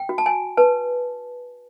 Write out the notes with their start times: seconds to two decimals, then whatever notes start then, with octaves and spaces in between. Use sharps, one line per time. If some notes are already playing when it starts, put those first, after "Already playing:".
Already playing: G5
0.09 F#4
0.18 A5
0.26 G#5
0.57 B4 A5